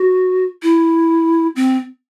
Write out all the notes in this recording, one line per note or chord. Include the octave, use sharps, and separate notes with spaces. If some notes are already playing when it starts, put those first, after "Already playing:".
Already playing: F#4
E4
C4